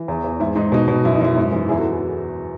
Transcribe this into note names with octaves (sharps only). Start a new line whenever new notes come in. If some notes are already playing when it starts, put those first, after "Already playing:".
Already playing: E3
E2
E2
G#2 E4
G#2 D#4
B2 D#4
B2
F#2 E4
D#4
F#2 E4
G#2
E3
E2 E4 G#4
F#4 A4